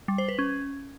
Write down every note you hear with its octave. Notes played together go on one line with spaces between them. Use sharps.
G3
C5
B4
C#4